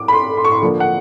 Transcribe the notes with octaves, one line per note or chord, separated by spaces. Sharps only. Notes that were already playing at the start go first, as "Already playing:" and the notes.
Already playing: D6
B5
C6
C6
C#6
C6
D3 F3 A#3 D4
F#5